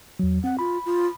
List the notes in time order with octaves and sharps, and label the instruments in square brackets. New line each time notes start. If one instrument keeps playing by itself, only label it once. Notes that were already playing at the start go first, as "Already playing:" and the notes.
[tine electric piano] E2 F#3
[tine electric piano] C4 [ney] F#5
[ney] F4 [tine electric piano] B5
[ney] F4